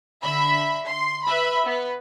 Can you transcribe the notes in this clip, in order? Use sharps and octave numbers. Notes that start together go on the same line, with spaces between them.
D3 E5 B5
C6
B4 E5 B5
B3 B4